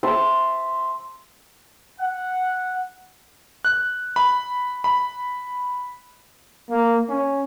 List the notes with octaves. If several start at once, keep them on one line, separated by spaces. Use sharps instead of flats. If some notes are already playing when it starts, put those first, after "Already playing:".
E5 A5 C6
F#5
F#6
B5
B5
A#3
C#4